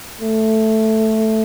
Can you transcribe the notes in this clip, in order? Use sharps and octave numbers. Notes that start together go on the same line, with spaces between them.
A3